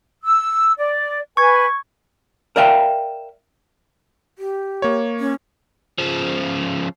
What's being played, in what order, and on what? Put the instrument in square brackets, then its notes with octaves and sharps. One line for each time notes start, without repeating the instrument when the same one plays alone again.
[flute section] E6
D5
[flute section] B4 G#5 [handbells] C#6 G#6
[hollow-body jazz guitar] A#4 D5 E5 F5 G5
[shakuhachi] G4
[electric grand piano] A#3 C#5
[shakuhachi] C#4
[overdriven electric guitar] C#3 F3